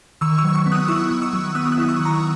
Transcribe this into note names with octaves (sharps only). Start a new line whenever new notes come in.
D#3 C#6 E6
C#6 E6
F#3
C#6 E6
B3
D#6 F#6
E4 C#6 E6
D#3
C#6 E6
F#3
B3 D#6 F#6
D#6 F#6
E4
D#6
C#6 E6
D#3
A#5 C#6